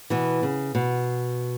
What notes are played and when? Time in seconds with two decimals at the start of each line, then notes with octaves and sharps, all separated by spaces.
0.10 B2 E3
0.43 C#3
0.75 B2